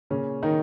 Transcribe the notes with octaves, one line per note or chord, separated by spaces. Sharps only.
A#2 C#3 C#4
D#3 D#4